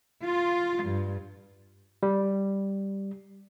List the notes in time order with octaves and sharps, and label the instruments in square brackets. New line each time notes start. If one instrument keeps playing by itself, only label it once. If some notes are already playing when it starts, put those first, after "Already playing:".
[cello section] F4
G2
[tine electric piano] G3